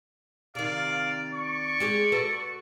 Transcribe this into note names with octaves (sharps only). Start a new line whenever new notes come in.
C3 D#3 D5 F5
D5 C#6
G#3 G4 G#4
F#4 A4 B4